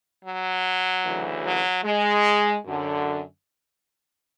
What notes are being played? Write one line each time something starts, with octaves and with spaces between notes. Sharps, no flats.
F#3
D2 C#3 E3
F#3
G#3
F#2 D3